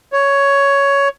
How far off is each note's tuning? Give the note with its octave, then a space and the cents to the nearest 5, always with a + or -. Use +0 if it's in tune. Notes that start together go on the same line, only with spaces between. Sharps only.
C#5 +10